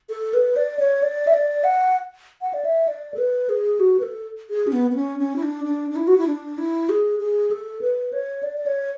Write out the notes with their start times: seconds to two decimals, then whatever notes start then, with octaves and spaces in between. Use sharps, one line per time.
0.09 A4
0.34 B4
0.56 D5
0.79 C#5
1.02 D5
1.27 E5
1.34 D5
1.64 F#5
2.41 F#5
2.54 D5
2.65 E5
2.88 D5
3.14 A4
3.18 B4
3.49 G#4
3.80 F#4
3.99 B4
4.03 A4
4.50 G#4
4.67 C#4
4.72 B3
4.91 B3
4.95 C#4
5.19 C#4
5.36 E4
5.43 D4
5.65 D4
5.91 D4
5.96 E4
6.07 F#4
6.18 E4
6.27 D4
6.58 E4
6.89 G#4
7.20 G#4
7.51 A4
7.81 B4
8.13 C#5
8.43 D5
8.57 D5
8.66 C#5